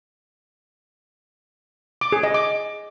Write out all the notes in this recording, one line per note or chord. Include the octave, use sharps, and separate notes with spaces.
D6
G#4
D#5
D6